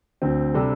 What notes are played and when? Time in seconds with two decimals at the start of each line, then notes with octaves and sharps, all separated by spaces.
0.22 D2 D3 C4
0.54 C3 G3 D4 A4